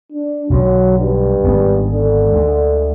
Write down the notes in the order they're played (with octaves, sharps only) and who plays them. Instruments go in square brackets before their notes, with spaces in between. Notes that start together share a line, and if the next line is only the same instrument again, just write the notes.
[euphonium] D4
[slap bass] B1 D3 [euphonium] F#3
[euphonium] G2
[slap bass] G#1 G#3 B3
[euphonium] D3
[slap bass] D2 G#3